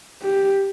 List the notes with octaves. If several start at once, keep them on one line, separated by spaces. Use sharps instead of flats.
G4